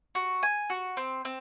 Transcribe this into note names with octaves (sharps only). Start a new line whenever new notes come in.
F#4
G#5
F#4
C4
C4